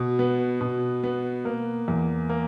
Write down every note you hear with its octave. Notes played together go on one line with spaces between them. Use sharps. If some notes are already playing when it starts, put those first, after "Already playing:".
Already playing: B2
B3
B2
B3
A#3
E2
A#3